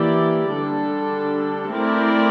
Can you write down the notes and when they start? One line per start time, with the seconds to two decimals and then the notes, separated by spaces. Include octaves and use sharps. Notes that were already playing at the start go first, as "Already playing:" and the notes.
Already playing: E3 A#3 E4 G4 D5
0.51 D3 G3 D4 A4
1.74 A3 C4 E4 A#4 D5